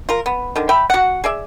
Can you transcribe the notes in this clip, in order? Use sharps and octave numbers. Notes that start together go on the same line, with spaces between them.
F4 A#4
B3
D3 D#3
E5 G5 B5
F#4 F#5
G#4 D5 E5